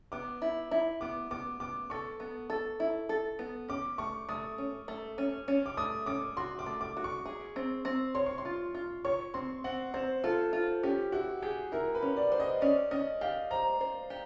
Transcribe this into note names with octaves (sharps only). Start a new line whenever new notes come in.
B3 D6
E4
E4
B3 D6
B3 D6
B3 D6
A4 C#6
B3
A4
E4
A4
B3
C#4 D6
A3 C#6
A3 D#6
C#4
A3
C#4
C#4
D6
A3 D#6
C#4 D6
F#4 C6
D6
A3
D6
F#4
C#6
G#4
C4
C4
C#5 C6
C#6
C6
F4
F4
C#5 C#6
C4 C6
C4 F#5
C4 C5
F4 A4
F4
C#4 G4
E4 F#4
G4 G#4
E4 A#4
B4
C#4
D5
C5
D#5
C#4 D5
C#4 D#5
G4 F5
C5 A#5
C5
G4